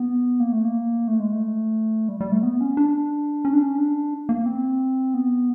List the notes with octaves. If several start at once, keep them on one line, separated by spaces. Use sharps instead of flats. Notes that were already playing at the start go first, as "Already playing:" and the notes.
Already playing: B3
A#3
A3
A#3
A3
G#3
A3
G3
G3
A3
B3
C#4
D4
C#4
D4
C#4
D4
A#3
C4
B3